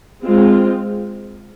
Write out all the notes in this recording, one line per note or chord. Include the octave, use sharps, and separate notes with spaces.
G#3 C4 F4